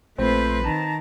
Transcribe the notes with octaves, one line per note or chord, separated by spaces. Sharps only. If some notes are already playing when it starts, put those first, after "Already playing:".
A#1 A3 C4 F4 B4 C5
D#3 A5 A#5